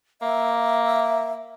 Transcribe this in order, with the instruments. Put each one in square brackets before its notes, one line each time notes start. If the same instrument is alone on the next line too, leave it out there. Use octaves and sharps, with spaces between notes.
[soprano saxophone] A#3 [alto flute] E5